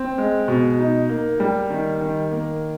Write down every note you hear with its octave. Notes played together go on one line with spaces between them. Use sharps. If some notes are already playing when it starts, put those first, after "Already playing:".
Already playing: C4
G#3
B2
D#4
A#3
G3
D#3
D#3
A#3